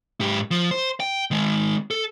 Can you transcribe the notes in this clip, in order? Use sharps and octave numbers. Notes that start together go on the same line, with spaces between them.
G#2 G4
F3
C5
G5
D#3 G#3
A4